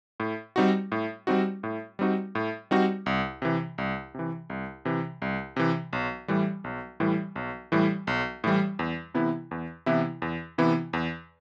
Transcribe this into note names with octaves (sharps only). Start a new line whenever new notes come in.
A2
G3 C4 D#4 F#4
A2
G3 C4 D#4 F#4
A2
G3 C4 D#4 F#4
A2
G3 C4 D#4 F#4
C2
C3 E3
C2
C3 E3
C2
C3 E3
C2
C3 E3
B1
A2 E3 G3
B1
A2 E3 G3
B1
A2 E3 G3
B1
A2 E3 G3
E2
C3 E3 B3 E4
E2
C3 E3 B3 E4
E2
C3 E3 B3 E4
E2